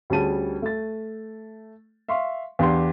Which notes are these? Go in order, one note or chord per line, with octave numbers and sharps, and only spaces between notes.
D2 G3 C#4 G#4 A5 D#7
A3 A6
E5 F5 C6 C#6
E2 D4 G4 F5 C6